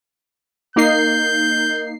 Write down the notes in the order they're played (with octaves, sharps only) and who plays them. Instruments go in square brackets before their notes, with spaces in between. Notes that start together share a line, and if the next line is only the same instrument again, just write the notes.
[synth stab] A#3 D#4 C7 [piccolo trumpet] G6